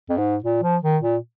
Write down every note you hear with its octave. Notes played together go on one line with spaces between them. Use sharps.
F2
G#2
A#2
F3
D#3
A#2